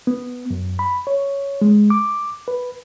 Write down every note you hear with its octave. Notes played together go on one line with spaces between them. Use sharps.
B3
F#2
B5
C#5
G#3
D6
B4